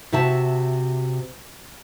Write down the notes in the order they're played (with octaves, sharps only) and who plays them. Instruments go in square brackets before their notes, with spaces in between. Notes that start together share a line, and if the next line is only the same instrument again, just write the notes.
[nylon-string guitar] C3 F#4 E5 A5